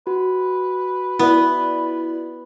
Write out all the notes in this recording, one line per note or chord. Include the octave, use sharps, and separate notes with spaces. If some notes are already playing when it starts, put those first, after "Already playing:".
F#4 B4
B3 E4 D5